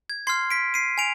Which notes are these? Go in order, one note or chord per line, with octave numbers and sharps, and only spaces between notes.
G#6
C6 F6 G#6 C7
B6 D7
C7 D#7
G#5 D7 F7